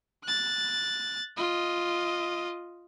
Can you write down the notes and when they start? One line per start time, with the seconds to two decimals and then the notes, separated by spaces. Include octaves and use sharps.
0.24 F#6 A6
1.37 F4 D#5